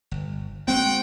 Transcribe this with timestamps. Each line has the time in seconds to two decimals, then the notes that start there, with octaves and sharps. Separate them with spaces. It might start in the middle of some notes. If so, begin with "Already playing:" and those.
0.11 G1
0.68 G#3 A#3 C4 F#4 F#5 G5